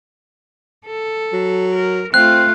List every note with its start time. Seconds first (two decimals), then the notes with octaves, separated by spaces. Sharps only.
0.86 A4
1.33 F#3
1.76 A#4
2.14 A3 C4 F4 F#6